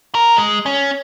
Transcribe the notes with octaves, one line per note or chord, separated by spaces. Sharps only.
A#4
G#3
C#4